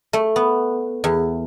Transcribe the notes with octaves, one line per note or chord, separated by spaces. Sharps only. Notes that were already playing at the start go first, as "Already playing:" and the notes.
A3
B3
E2